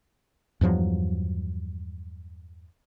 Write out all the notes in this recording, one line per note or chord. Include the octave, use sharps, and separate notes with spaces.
E2 G2 F3 F#3